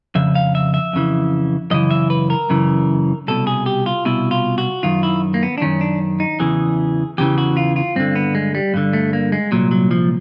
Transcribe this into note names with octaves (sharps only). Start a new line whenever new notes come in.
F2 C#3 E5
F5
E5
E5
F2 C#3 E3
F#2 C#3 E3 D#5
E5
B4
A#4
F#2 C#3 E3
C2 B2 A4
G#4
G4
F4
C2 B2 E4
F4
F#4
F#2 D#3 F4
E4
A#3
B3
D4
F#2 D#3 C#4
D4
D#4
E2 C#3 E3 G#4
E2 C#3 E3 G4
F#4
F4
F4
G2 D3 C4
B3
G#3
G3
G2 D3
A3
A#3
G#3
C2 A#2 F#3
F#3
F3